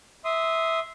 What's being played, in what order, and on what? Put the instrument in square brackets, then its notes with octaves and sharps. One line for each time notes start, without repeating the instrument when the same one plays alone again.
[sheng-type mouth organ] E5 C6 D#6